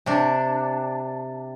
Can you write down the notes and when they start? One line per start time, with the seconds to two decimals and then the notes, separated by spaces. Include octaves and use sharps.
0.06 C3 D4